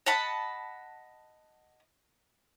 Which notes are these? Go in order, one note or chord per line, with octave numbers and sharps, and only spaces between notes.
D#5 F#5 A5 B5